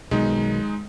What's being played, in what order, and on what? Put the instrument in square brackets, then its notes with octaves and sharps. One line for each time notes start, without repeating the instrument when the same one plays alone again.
[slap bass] B1 B2 D#3 [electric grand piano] G#3 D#4